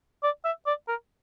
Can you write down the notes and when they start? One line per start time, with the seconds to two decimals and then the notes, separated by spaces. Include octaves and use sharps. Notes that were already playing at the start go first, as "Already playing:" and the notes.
0.23 D5
0.45 E5
0.67 D5
0.88 A#4